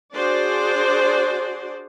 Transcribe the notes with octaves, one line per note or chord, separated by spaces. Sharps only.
D4 F#4 G#4 C5 D5